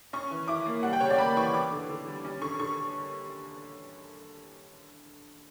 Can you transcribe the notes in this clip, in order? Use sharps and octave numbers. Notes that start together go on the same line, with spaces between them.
C#4 C#6
E3
E4 D6
A#3
G3 F#5
G5
C#3 C#5
D5
A#3 B5
E3 C#6
B3 D6
D3
D3
G3
C#4
D3 C#6
D3 C#6